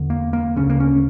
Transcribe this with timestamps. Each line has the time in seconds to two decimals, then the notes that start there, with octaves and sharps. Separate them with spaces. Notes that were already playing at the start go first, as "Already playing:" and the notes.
Already playing: E2 D3
0.10 A#3
0.33 A#3
0.56 D2 C#3 C#4
0.70 A#3
0.80 C#4